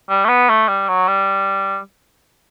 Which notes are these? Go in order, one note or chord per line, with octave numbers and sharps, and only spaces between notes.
G3
A3
B3
A3
G3
F#3
G3